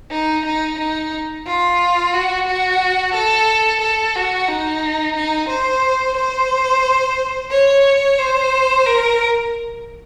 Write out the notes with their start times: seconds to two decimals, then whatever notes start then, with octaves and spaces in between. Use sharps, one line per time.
0.11 D#4
0.45 D#4
0.78 D#4
1.46 F4
2.14 F#4
2.47 F#4
3.14 A4
3.81 A4
4.15 F#4
4.48 D#4
5.16 D#4
5.49 C5
6.17 C5
7.51 C#5
8.18 C5
8.86 A#4